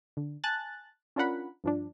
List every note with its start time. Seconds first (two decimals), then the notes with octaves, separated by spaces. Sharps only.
0.17 D3
0.44 G#5 A5 F#6 A6
1.16 C#4 D4 F4 A#4 F#5 B5
1.64 G2 F3 D4